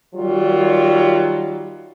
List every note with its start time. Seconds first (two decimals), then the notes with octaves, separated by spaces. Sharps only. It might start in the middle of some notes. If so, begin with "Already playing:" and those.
0.14 D#3 F#3 G3 F4